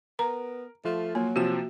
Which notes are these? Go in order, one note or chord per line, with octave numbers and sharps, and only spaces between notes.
B3 A#4 A#5
F3 A3 F4
F#3 A#3
C3 F3 F#4 E7